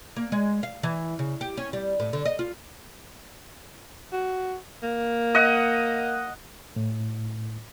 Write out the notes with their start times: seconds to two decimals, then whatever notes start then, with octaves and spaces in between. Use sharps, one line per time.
0.16 A#3
0.32 G#3
0.63 F5
0.83 E3
1.19 C#3
1.41 G4
1.57 C#4
1.73 G3
2.00 A2
2.13 D3
2.25 D#5
2.39 F4
4.12 F#4
4.83 A#3
5.35 D#5 F#5
6.76 A2